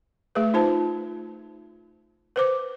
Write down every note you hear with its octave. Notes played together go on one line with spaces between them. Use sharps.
A3 G#4 B4
D#4 F4 C5 A5
B4 C5 D6